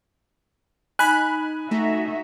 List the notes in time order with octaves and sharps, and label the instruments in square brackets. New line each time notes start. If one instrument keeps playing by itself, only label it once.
[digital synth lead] D#4 [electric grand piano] G#5 [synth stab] B5 F#6
[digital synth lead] A3 [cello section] D#4 F#4 E5